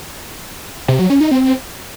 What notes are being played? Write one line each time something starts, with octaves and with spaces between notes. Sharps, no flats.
C3
F#3
C#4
D#4
C4